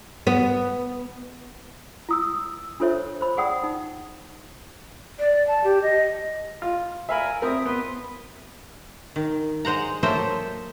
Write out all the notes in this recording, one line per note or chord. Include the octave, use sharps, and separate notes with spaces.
B3
E4 D#6 E6
D4 F4 A4 C5 C#5 E5
C5 B5
G#4 D5 F#5 G5 D#6
D#4
D5
A5
G4
D#5
F4
A#4 E5 F5 G#5 B5
C4 A#4 E5 D#6
B3 B4 C6
D#3
G#3 C5 F#5 A#5
F#3 A#3 A4 C5 D#5 E5